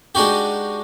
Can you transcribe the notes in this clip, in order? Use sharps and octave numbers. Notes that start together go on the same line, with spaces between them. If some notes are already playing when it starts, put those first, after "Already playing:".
G#3 D4 D#4 F#4 G4